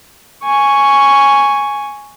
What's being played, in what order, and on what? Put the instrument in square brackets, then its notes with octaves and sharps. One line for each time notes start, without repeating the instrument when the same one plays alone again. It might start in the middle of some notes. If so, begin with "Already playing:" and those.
[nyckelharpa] G#5 C#6